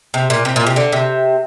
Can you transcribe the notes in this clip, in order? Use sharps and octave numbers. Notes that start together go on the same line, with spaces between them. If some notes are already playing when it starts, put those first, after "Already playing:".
C3
A#2
C3
A#2
C3
D3
C3